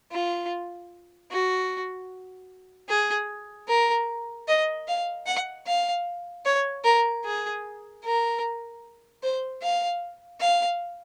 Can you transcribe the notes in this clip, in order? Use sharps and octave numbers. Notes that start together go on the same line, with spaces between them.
F4
F#4
G#4
A#4
D#5
F5
F#5
F5
C#5
A#4
G#4
A#4
C5
F5
F5